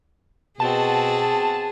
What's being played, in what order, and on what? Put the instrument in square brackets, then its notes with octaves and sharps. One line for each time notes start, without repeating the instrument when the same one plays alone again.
[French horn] B2 [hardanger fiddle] C4 F#4 [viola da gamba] G#4 [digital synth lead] A5